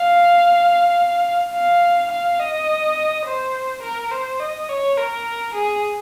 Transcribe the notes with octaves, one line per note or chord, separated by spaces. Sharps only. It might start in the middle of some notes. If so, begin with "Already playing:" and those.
Already playing: F5
F5
F5
D#5
C5
A#4
C5
D#5
C#5
A#4
G#4